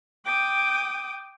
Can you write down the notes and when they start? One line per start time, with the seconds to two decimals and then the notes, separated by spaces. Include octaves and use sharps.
0.24 G5 D6 D#6